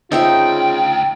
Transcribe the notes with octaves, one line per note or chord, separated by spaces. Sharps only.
D2 C#3 D#4 F4 C5 E5 G5